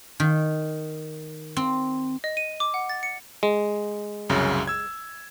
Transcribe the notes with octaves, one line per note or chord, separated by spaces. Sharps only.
D#3
C4
D#5
D#7
D6
F#5
A6
C#7
G#3
C2 F#2 C#3
E6 G#6